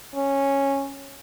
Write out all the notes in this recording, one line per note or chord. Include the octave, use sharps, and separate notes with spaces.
C#4